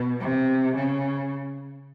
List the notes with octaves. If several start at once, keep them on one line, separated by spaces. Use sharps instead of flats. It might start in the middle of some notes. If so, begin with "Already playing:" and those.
Already playing: B2
C3
C#3